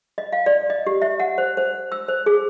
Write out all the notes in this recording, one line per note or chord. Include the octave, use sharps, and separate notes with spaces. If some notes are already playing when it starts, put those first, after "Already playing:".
D#5
F5
D5
D#5
G4
E5
F#5
C5
C5
E6
C5
G#4